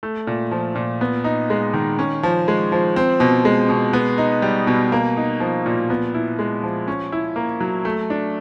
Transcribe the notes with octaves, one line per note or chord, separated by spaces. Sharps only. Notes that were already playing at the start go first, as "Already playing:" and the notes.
A3
A#2
F3
A#2
B3
D#4
G#3
D#3
C#4
F3
G#3
F3
C4
B2
G#3
B2
B3
D#4
G3
B2
A#3
D#4
F3
A#2
B3
E4
G#3
F3
C#4
E4
A#3
F#3
A3
D4